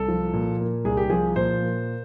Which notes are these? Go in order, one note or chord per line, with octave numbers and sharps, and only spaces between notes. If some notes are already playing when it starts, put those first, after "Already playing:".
Already playing: C2 A4
F3
A#2
A#3
C2 G#4
G4
F3 G#4
A#2 C5
A#3